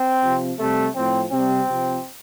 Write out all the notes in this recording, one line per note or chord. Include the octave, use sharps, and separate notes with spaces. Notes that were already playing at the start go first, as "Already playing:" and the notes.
Already playing: C4
C3 F3
C3 G3 A3
A2 F3 C4
C3 G3 C4
C3 F3